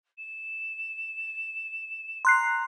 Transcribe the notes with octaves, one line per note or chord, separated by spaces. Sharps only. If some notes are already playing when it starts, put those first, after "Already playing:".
E7
A#5 C6 F#6 C7